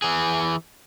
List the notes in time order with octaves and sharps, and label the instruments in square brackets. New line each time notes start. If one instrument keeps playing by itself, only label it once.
[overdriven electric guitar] E3 G#4